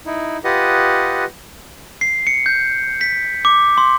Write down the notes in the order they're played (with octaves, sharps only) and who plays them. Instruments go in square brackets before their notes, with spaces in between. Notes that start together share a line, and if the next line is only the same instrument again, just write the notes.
[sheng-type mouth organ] D#4 E4
F4 G4 B4 D#5 F#5 D#6
[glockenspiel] C7
C#7
G6
B6
D6
C6